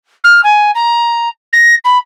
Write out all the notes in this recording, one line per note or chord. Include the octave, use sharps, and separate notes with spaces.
F6
G#5
A#5
A#6
B5